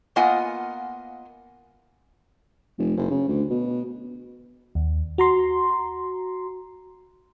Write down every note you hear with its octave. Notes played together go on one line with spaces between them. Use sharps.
A#3 B3 F4 D#5 F#5 G#5
F1
F#1
C#3
D2
B2
D#2
F#4 A#5 C6